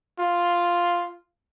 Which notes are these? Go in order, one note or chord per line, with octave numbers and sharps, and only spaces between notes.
F4